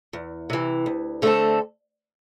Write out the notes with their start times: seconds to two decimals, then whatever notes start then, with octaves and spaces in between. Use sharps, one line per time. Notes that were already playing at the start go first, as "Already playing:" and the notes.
0.13 E2
0.50 C3 E3
0.86 D2
1.22 D3 A3 C4 A4